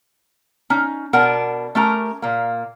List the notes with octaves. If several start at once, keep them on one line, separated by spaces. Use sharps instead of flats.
C#4 D#4
B2 D4 A#4 F#5
A3 C#4 G4 A#4 A#5
A#2 A#3